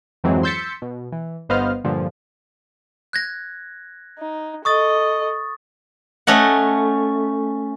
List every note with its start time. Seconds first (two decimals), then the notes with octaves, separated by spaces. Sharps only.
0.24 F2 G#2 E3 F#3 G#3 C4
0.43 C6 E6 G6 A6 B6 C#7
0.82 B2
1.12 E3
1.49 G1 B3 C5 D#5 F5 F6
1.84 G2 A#2 D3 F3
3.13 F#6 G#6 A#6
4.19 D#4
4.65 A4 D#5 C#6 D#6 A6
6.27 A3 C#4 D#5 F#5